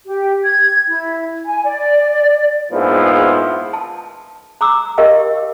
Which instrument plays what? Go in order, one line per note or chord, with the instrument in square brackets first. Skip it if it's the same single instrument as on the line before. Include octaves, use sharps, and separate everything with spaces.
[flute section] G4
G#6
E4
G#5
D5
[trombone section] A#1 G#2 F3 B3 E4
[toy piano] A5
A#5 D6 E6
G4 A#4 D#5 F5 G5